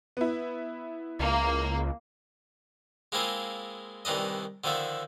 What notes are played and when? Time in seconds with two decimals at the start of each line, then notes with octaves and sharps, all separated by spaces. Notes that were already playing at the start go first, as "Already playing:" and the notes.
0.17 B3 E4
1.20 C#2 A#3
3.12 G#3 A#3 C4 E4 F4 G#4
4.05 C2 D#3 E3 D4 D#5
4.64 D3 D#3 F3 D4 E5